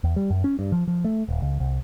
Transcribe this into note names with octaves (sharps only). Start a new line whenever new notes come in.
E2
G3
F#2
C#4
G2
F3
F3
A3
D#1
C#2
C2